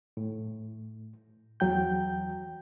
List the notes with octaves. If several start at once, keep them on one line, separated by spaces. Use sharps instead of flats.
A2
E2 F#3 G5 G6